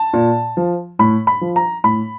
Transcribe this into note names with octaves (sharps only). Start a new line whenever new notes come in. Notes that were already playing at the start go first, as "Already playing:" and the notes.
Already playing: A5
A#2
F3
A2 B5
B5
F3
A#5
A2 B5